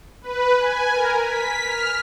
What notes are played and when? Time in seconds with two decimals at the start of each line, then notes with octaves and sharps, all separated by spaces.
0.22 B4
0.59 G#5
0.93 A#4
1.22 B6
1.66 F6